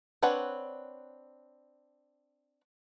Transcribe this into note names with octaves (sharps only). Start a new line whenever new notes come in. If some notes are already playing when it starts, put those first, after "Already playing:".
C4 D4 B4 C#5 F#5